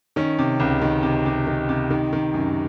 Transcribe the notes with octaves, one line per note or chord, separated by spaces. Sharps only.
D#3 C#4
C3
C#2
D#3
C3
C3
D#3
C3
D#3
D#3
F#2